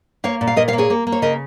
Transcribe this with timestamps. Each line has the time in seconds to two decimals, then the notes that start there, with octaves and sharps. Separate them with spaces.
0.24 A#3 C#5 F5
0.41 A#2
0.47 F5
0.56 A#2 A#4 D#5
0.68 C#5 F5
0.73 A#3
0.78 G#4 C#5
0.90 A#3
1.07 A#3
1.12 C#5
1.22 C#3 A#4 D#5